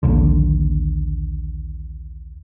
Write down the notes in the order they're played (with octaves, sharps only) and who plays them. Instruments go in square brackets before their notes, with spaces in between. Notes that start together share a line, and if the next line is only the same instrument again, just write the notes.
[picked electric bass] A#1 D#2 D3